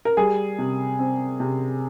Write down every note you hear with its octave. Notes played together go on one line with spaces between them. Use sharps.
A#4
G3 G#4
C3
C4
C3